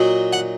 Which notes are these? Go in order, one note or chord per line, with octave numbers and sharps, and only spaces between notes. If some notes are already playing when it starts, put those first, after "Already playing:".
Already playing: A#2 F#3 D#4
F#5